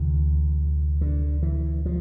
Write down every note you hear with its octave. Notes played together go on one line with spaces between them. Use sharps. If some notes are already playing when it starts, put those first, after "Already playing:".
Already playing: D2 C3 E3
D3
E3
F3